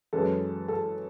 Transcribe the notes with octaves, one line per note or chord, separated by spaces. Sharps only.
F#2 E3 G#3 C#4 A4
A4